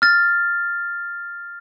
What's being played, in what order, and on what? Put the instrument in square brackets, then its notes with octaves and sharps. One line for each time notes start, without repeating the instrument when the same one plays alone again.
[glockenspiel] F6 A6